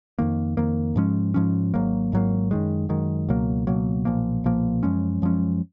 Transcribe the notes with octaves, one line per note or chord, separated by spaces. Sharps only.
F2 D#3 A#3
F2 D#3 A#3
G#2 F3 G#3 C#4
G#2 F3 G#3 C#4
G#1 G#2 F#3 A#3
G#1 G#2 F#3 A#3
F#2 D#3 G#3
F#2 D#3 G#3
C#2 B2 F#3 A#3
C#2 B2 F#3 A#3
B1 A#2 F3 A#3
B1 A#2 F3 A#3
F#2 F3 G#3 C#4
F#2 F3 G#3 C#4